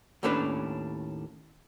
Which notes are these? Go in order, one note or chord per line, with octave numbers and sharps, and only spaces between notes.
D#2 A2 A3 C#4 D4 B4